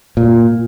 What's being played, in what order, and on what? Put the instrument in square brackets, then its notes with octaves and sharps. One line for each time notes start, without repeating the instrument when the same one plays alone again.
[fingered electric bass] A#2